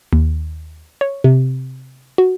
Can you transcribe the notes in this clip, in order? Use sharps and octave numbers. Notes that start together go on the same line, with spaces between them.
D#2
C#5
C3
F#4